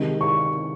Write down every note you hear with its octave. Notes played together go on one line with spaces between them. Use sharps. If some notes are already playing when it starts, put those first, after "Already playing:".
Already playing: C3 D#3 G#3
C#6